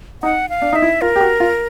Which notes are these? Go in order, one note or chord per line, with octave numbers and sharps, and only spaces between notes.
D#4 F#5
F5
D4
D#4 E5
E4
F4 A#4
G4
F#4
F4